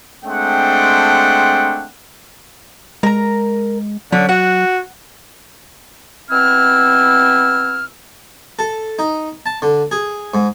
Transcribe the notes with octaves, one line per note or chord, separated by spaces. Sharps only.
G#3 A3 C4 D4 F#5 G5
G#3 A#4 A#5
D3 F#3 C#4
F#4 F#5
B2 C4 E4 E6 F6
A4
D#4
A5
D3
G#4
G#2